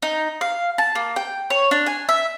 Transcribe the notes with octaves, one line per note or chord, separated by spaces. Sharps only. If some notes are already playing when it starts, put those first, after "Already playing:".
D#4
F5
A5
A#3
G5
C#5
D4
G#5
E5